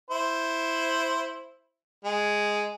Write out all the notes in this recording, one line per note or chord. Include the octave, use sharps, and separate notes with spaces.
E4 C5
G#3